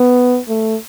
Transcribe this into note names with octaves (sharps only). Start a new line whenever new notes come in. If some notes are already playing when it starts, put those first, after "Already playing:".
Already playing: B3
A3